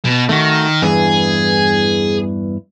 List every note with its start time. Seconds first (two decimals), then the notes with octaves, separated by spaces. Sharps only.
0.05 B2
0.29 D#3 A3 F#4
0.82 E2 G2 E3 G#4